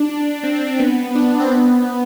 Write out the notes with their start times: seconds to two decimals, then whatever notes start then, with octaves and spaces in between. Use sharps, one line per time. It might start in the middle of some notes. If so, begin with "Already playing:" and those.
Already playing: D4
0.43 C4
0.55 C4
0.67 C4
0.79 B3
1.15 D4
1.40 C4
1.52 B3